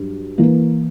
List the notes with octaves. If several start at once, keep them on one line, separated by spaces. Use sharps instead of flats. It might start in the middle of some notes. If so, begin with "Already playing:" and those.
Already playing: G2 F#3
E3 A#3